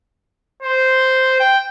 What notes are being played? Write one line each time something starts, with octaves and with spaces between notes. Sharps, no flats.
C5
G5